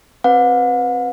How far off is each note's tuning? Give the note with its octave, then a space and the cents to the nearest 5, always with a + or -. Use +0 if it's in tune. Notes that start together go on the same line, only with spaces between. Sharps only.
C4 +25 B4 +0 F#5 -40